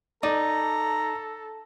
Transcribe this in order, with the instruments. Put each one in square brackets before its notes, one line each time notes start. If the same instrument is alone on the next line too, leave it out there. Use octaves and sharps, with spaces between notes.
[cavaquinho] D#4 [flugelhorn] A4 [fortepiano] D5 [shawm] A#5